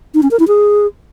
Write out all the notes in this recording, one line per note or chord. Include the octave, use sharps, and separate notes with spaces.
D#4
C#4
A#4
E4
G#4